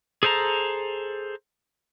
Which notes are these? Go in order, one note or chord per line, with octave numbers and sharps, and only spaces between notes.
G#4 A4 C5 A5 A#5